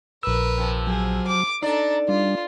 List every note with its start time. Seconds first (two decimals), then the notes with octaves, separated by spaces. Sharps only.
0.23 A#1 A#4 B4 E6
0.58 C3 F3
0.87 F#3 G#4
1.27 D6
1.62 D4 D#4 A4 D5 A#5
2.08 G3 D4 F4